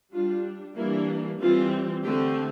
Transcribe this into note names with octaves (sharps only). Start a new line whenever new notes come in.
G3 D4 F4
E3 G3 A#3 D4 E4
E3 G3 C4 F4
D3 A3 C4 G4